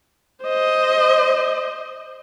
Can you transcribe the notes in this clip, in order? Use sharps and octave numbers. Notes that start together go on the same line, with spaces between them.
C5 D#5